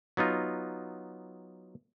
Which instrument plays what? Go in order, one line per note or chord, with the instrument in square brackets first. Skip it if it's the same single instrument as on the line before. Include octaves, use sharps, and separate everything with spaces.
[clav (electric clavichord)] F#3 B3 D#4 F4